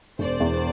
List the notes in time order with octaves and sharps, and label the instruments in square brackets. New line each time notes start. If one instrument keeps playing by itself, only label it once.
[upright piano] E1 [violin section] C5 D5
[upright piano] E2